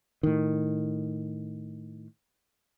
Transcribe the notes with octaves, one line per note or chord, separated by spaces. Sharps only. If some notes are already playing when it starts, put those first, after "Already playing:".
A2 D#3